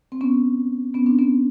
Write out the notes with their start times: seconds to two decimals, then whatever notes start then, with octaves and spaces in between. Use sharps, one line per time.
0.12 C4
0.21 B3 C#4
0.94 B3 C#4
1.06 C4 D4
1.19 B3 C#4